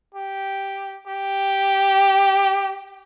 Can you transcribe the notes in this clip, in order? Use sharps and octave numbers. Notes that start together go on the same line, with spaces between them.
G4
G4